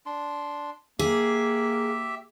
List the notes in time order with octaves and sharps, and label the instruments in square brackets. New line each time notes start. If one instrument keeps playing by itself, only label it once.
[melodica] D4 C6
[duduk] A#3 [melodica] G4 E5 [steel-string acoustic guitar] G#4